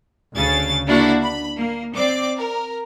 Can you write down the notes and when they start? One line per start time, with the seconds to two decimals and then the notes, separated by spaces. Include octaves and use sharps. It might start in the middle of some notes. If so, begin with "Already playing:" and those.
0.34 D2 C#3 A6
0.86 A#3 D4 E4 F#4
1.22 B5
1.57 A#3
1.94 C4 D5 D6
2.37 A#4